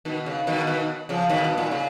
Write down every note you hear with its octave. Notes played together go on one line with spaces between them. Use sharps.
B2 D#3
C#3
B2 D#3
B2 D#3
C#3 F3
B2 D#3
B2
A#2
C#3